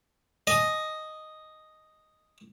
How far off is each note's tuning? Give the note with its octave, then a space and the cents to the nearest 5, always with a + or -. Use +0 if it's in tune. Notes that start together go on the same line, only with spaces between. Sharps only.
D#5 +0 G#5 +40